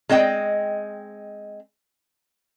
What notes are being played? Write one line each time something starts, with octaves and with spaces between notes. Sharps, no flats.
G#3 C4 D#5 G5